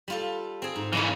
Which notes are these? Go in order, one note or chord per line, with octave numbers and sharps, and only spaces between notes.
G3 F4 A4
C4 G#4
G#2
C#3 E3 G#4 D#5 F5